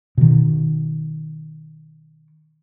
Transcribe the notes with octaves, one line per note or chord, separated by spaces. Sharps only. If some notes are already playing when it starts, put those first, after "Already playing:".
B2 D#3